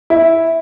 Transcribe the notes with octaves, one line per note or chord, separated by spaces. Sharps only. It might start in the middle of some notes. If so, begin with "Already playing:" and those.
E4